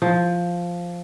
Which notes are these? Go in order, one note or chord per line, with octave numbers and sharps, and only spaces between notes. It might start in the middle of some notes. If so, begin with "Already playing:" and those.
F3